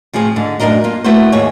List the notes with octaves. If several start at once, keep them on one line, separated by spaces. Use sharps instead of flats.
A2 F3 C4 G#4
G#2 D3
F#2 A2 C3 D4 A#4 D#5
A#3 F4
A3 B3 E4 F#4 C5
D#2 G#2 G#4 C#5